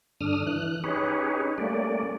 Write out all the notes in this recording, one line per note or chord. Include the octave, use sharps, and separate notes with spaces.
G2 D3 D4 D#6 F6
E3 F#6
C#4 D#4 G4 G#4 B4 C#5
G3 A3 A#3 C#4 D5